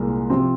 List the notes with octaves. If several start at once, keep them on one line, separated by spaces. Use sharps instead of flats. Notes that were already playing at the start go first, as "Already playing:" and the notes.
Already playing: C2 A#2 G#3
C3 F3 C4